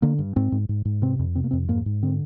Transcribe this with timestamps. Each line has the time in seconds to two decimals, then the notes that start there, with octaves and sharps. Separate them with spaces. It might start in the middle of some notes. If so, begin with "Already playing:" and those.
0.02 D3 A#3
0.18 G2
0.36 G#2 C4
0.52 G#2
0.69 G#2
0.85 G#2
1.02 C3 C4
1.19 F2
1.35 C3 C4
1.44 A#3
1.51 F2 C4
1.68 G#2 A#3
1.86 G#2
2.02 D3 C4